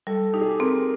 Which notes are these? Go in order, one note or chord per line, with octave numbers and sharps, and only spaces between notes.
G3 A4
D#4 G4
G#4
G4
C4 A#4